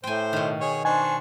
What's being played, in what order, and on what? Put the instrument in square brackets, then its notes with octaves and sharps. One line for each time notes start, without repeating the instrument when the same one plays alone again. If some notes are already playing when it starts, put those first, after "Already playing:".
[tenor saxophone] A2 [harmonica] C5 [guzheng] G5 G#5
[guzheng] B2 D#3
[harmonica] G#4 C#5
[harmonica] D4 D#4 C#6 [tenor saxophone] C5 [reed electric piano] G#5